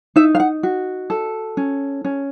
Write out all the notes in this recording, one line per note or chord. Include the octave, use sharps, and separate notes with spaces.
D#4 E5
F5
F#5
F#4
A4
C#4
C#4